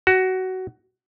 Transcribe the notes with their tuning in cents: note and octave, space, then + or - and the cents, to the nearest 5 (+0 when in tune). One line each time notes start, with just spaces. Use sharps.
F#4 +15